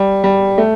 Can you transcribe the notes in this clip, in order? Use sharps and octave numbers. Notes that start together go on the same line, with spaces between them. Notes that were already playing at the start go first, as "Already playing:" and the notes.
Already playing: G3
G3
A3